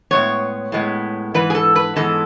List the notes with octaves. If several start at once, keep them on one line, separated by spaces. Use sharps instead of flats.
A2 G#3 B3 C#5
A2 G#3 B3
G#2 E3 B4
G#4
A4
B4
G#2 E3 G#3 B3 A4